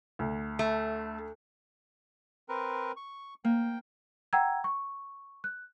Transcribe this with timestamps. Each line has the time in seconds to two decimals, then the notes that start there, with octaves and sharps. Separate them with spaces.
0.19 D2
0.59 A3
2.49 C4 A#4 B4
2.97 C#6
3.45 A#3 G5
4.33 F#5 G5 A#5 E6 G#6
4.64 C#6
5.44 F#6